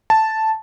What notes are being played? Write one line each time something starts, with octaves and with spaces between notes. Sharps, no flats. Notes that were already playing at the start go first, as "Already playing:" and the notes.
A5